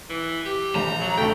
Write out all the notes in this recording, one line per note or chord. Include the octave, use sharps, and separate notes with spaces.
E3
G4
A#1 A#5
F#3
D2 A3 G5